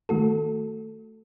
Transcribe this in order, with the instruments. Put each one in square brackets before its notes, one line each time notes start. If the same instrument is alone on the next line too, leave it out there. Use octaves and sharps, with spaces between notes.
[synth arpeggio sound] D#3 A3 F#4 A4